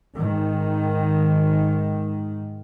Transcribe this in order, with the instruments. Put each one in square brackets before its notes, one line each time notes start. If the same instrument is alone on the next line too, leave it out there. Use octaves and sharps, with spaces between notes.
[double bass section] G#2 D#3